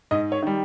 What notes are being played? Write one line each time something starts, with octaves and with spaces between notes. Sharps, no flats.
G#2 D#5
C#5
D#3 G3